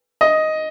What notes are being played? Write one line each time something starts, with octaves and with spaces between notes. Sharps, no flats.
D#5